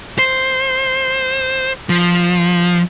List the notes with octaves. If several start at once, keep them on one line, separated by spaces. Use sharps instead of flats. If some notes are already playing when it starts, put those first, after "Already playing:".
C5
F3